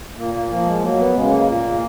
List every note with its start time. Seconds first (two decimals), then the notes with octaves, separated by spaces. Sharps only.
0.17 A#2 A#3
0.34 A#3
0.50 F3 A#3
0.66 G#3
0.81 F#3 A#3
0.98 B3
1.14 C#3 G#3
1.30 A#3
1.46 A#2